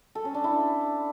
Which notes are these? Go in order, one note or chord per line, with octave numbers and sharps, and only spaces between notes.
A4
C#4
D4
E4